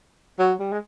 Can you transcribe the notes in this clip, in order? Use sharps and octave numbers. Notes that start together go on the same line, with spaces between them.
F#3
G3
G#3